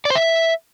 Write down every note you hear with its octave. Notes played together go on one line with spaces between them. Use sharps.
D5
C5
E5